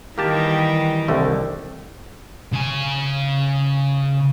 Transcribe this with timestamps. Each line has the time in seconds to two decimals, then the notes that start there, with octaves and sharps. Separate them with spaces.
0.18 D#3 E3 G3 A#3 G4 A5
1.08 C2 D3 A3
2.53 C#3 G#5